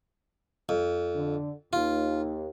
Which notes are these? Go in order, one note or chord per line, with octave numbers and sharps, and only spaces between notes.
F2
D3
D#2 F4